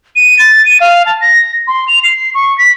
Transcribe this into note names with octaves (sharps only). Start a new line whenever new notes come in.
D#7
A6
D#7
F5
A5
A#6
C6
F7
C7
C#6
B6